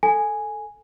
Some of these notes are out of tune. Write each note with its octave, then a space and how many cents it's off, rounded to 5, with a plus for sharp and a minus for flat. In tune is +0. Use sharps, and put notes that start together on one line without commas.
A4 +0 G#5 +0